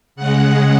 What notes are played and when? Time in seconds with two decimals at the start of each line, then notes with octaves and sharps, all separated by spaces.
0.16 C#3 G#3 F#5